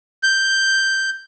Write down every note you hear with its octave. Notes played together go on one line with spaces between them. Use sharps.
G6